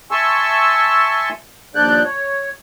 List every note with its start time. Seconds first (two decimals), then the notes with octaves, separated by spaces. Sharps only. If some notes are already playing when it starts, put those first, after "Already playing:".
0.11 E5 G#5 A5 C6 C#6 E6
1.75 D#2 F3 D4 D5 F#6 G6
2.04 C#5